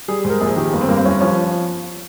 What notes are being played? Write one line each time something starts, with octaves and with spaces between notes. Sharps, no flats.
G3 G#4
G#2
A#4
A#1 G#4
D#3 G4
G1 A#3
C4
G2 A#3
C4
G1 C#4
F3 C#4